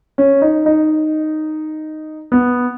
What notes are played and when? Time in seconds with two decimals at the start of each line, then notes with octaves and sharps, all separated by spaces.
0.18 C#4
0.42 D#4
0.66 D#4
2.32 B3